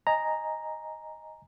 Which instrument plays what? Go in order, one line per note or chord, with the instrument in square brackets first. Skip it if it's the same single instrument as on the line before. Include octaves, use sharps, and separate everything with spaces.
[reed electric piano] D#5 G#5 A#5